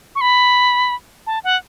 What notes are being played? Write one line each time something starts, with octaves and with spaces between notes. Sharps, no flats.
C#6
B5
A5
F#5